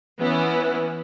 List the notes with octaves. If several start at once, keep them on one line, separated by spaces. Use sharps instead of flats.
E3 B3 C#4 E4